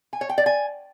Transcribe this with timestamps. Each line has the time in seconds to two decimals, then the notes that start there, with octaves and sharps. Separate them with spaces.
0.13 G#5
0.21 C#5
0.29 G5
0.38 D5
0.46 G#5